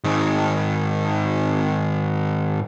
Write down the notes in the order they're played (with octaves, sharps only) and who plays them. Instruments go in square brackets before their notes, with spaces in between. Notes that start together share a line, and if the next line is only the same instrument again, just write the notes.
[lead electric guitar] G#2 D#3